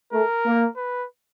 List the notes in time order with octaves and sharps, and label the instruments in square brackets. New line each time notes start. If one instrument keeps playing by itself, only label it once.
[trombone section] A3 [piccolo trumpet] A#4
[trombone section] A#3
[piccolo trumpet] B4